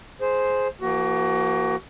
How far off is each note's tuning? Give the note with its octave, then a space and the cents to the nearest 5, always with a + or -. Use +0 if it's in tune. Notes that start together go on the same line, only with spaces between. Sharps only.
G#4 +10 C5 +0
F3 -40 A#3 +0 F#4 +30